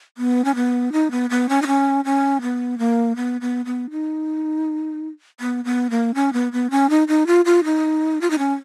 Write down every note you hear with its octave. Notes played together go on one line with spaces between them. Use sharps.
B3
C#4
B3
D#4
B3
B3
C#4
D#4
C#4
C#4
B3
A#3
B3
B3
B3
D#4
B3
B3
A#3
C#4
B3
B3
C#4
D#4
D#4
F4
F4
D#4
F4
D#4
C#4